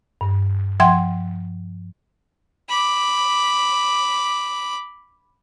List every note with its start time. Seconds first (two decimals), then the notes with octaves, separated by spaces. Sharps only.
0.21 G2
0.80 F3 E5 F#5 G5 C6 G#6
2.69 B5 D6